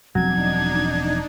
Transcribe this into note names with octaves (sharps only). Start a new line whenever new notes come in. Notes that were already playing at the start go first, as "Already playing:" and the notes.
E1 F3 F#3 C4 D4 D#4 G#6